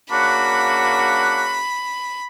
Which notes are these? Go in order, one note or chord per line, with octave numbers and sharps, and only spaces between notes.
C#3 A#3 D4 F#4 B5